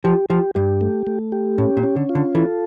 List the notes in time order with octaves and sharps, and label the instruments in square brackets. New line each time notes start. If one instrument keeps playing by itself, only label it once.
[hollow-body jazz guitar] F3 [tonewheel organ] G4
[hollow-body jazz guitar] F3 [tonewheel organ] G4
[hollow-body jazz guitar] G2 [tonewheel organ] G4
[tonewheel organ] A3
A3
G4
[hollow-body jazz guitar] A2 [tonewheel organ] C#4
[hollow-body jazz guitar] A#2
[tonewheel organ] C#4
[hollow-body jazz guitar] D3
[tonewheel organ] F4
[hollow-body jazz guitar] D3
[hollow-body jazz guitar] E3 [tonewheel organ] A4